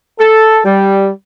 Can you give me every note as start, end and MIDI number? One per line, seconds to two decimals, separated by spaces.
0.19 0.59 69
0.64 1.09 55